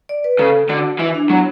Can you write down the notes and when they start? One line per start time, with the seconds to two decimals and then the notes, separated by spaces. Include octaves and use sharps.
0.09 D5
0.24 B4
0.39 C#3 A4
0.69 D3 F#4
0.99 E3 E4
1.15 D4
1.29 F#3 B3